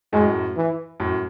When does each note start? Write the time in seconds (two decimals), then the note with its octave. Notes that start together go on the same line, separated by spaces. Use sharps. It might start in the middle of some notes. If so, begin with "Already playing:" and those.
0.13 F#2 A2 G#3
0.56 E3
1.00 F#2 A2